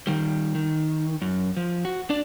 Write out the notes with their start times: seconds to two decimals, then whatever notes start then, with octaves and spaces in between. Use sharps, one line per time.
0.07 D#3 G3
0.55 D#3
1.22 F#2
1.57 F3
1.85 F#4
2.10 D4 D5